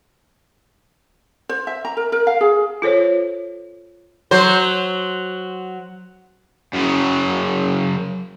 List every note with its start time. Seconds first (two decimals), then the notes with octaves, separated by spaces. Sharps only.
1.49 C5
1.67 E5
1.85 A#5
1.97 A#4
2.12 A#4
2.27 F5
2.41 G#4
2.82 F4 A4 C5 C#5
4.31 F#3 C5
6.73 F#2 C#3